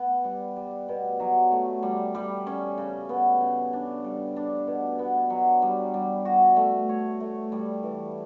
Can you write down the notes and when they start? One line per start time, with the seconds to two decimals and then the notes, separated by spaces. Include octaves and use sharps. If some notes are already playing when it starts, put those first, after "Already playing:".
Already playing: B3
0.24 G3
0.57 G3
0.89 B2
1.20 F#3
1.52 A3
1.83 G3
2.15 G3
2.47 C#4
2.78 C#3
3.09 B3
3.41 C#3
3.73 D4
4.04 G3
4.36 D4
4.67 B2
4.99 B3
5.30 F#3
5.62 G3
5.94 G3
6.25 F#4
6.57 A3
6.89 C#5
7.20 A3
7.52 G3
7.83 E3